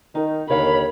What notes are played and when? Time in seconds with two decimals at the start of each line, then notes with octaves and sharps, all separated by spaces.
0.15 D#3 D#4
0.50 D#2 D3 D#3 C#5 F5 B5